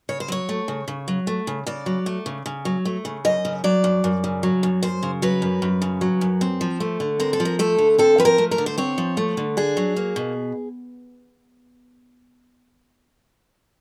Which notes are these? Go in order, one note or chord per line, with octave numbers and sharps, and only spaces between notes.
C#3 C#5
C5
F#3 C#5
A3
C#3
C#3
F#3
A3
C#3
C#3 D5
F#3
A3
C#3
C#3
F#3
A3
C#3
F#2 D#5
C#3
F#3 D5
F#2
F#2
C#3
F#3
F#2
F#2 C5
C#3
F#3 B4
F#2
F#2
C#3
F#3
F#2
C4
F3
A3
D3
C4 A#4
A4
F3
A#4
A3 A4
D3
C4 A4
F3 B4
A#4
A3
A#4
D3
C5
C4 C#5
F3
A3
D3
D4 G#4
F#3
A#3
B2